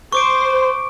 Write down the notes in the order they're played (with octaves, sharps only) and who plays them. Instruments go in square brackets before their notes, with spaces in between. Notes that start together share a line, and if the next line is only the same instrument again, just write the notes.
[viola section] C5 [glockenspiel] C#6 D6 D7